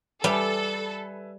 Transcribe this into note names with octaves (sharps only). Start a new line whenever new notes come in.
G3 A4 B4 E5 G#5